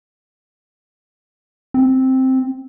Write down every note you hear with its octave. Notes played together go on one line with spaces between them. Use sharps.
C4